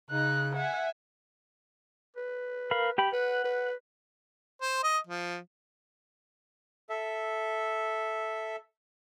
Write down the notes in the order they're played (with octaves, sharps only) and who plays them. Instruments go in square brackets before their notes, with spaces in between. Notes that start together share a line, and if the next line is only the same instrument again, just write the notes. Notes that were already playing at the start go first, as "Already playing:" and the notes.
[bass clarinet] C#3 [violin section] D#4 [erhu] F#6
[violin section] E5 G#5 [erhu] F#5
[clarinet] B4
[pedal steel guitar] A#4 F5 B5
G4 G5 B5
[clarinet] B4 [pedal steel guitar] F#5
[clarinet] B4
[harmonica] C5
D#5
F3
[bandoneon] A4 E5